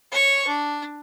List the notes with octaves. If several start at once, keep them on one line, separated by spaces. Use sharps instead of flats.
C#5 C#6
D4